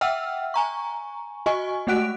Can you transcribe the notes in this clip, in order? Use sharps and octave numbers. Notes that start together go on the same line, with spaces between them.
E5 F#5 G5 E6 F6
G#5 A#5 C#6
F#4 D#5 G#5 C#6
G#3 A3 F#4 F#5 F#6 D7